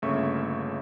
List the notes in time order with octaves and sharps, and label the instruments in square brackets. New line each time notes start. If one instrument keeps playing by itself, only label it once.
[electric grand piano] G1 C#3 A3 A#3 E5 C#6